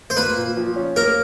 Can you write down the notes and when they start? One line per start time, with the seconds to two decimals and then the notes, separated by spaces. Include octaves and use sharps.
0.10 C5
0.17 A#3 B4
0.37 A#2
0.57 F3
0.76 C#4
0.96 A#3 A#4